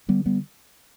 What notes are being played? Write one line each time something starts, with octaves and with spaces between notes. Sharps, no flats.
D3 G3 B3
G3 B3